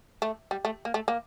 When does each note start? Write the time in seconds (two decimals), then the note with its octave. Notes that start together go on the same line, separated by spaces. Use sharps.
0.22 A3
0.51 G3
0.65 A3
0.85 A#3
0.94 A3
1.08 A#3